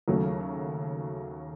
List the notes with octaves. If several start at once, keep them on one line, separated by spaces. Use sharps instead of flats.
D#2 C#3 F#3 A3